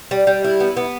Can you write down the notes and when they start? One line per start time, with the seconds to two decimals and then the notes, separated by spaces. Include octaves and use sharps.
0.11 G3
0.27 G3
0.44 E4
0.60 B3
0.77 B3